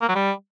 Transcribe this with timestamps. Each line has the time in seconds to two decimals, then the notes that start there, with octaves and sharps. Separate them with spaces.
0.02 A#3
0.09 F#3
0.15 G3